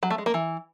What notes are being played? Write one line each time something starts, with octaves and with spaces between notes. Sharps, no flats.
F#3
A3
G#3
A#3
E3